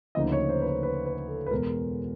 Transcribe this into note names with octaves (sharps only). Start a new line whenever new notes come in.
D2 C#3 F3 A#3 D#4 D#5
C#5
C5
B4
C5
B4
B4
A4
B4
E2 B2 G#3 A#4